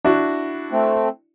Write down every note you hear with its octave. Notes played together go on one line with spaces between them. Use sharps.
D4 E4 F#4
A3 C4